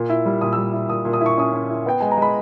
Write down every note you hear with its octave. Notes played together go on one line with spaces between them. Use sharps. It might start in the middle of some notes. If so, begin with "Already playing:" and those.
Already playing: A#2
E4
G3
A#2 D#6
E6
G3
E4
A#2 D#6
A#2
D#6
E4
C#6
C#4 D#6
C#4
E4
B3 G5
G#3 G#5
A#5
G#3 B5